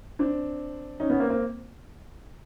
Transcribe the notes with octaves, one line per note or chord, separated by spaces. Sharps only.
C4 D4
C#4 D#4
B3 C#4
A#3 C4
A#3 C4